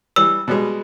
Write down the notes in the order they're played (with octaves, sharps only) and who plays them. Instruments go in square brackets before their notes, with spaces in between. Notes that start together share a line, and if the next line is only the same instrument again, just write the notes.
[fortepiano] E3 G3 [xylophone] E6
[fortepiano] B2 G3 G#3